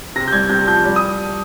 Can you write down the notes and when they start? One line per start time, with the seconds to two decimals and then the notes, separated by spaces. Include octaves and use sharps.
0.16 C3 A#6
0.28 G6
0.32 C2 G#6
0.49 C3 G6
0.67 F3 G6
0.85 G3
0.96 D#6